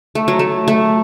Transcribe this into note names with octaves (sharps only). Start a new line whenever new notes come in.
A3
F#3
A3
A3